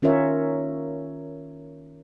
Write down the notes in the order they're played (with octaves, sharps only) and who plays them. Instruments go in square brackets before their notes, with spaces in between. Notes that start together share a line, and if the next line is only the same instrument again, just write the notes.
[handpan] D#3 C#4 F4 A#4 C#5 E5